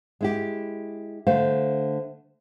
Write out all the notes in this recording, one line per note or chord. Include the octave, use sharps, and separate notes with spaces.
G#3 E4 G4
D3 A3 C5 F5